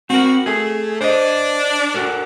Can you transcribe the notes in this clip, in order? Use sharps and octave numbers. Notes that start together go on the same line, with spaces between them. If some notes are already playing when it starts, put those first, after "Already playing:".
C4 F#4 A#4
A3 G#4
D4 C5 D#5
F#4 A4 A#4